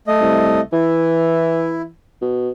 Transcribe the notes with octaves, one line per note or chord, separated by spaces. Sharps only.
A3 D#5
C2
E3 E4
B2